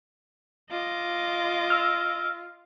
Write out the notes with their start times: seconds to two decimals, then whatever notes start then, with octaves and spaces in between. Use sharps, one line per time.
0.71 F4 D#5 D6
1.70 E6 F6